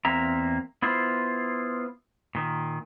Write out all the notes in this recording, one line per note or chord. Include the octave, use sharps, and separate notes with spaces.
E2 A#3 C4 E5 A#5
B3 E4 F4 C5
A#2 D#3